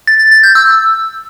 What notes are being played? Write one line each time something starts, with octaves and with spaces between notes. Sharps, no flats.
A6
A6
A6
G6
E6